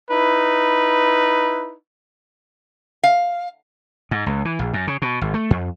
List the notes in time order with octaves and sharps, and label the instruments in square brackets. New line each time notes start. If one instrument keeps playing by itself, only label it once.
[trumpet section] D#4 E4 B4
[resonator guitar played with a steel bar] F5
[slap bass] G#2
C#2
E3
A#1
F#2
C#3
B2
G#1
A3
F2